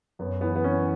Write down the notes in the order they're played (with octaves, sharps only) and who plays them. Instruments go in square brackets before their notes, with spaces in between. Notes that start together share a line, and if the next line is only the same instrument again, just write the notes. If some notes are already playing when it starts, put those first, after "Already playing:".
[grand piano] F#2 [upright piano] B3
[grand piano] E3 [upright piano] B3
[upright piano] B3
[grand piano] E3 [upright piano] C#4